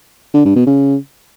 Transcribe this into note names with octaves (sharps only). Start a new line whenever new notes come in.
D3
G2
B2
C#3